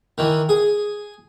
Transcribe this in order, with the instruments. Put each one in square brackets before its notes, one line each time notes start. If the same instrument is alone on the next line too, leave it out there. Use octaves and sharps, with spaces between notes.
[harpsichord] D#3 E3
G#4